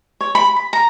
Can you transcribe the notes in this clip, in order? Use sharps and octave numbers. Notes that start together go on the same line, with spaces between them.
C#5
B5
B5
A#5